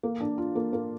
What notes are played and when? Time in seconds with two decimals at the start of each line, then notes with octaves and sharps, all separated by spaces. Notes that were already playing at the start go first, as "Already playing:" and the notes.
0.03 A#3
0.20 D4
0.38 F4
0.55 A#3
0.73 A#3